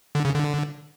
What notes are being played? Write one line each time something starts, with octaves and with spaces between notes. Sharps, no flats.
D3
C#3
D3